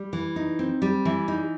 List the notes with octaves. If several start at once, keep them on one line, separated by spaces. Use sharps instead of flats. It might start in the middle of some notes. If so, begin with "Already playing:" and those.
Already playing: G3
E3
D#4
C4
G3
E3
D#4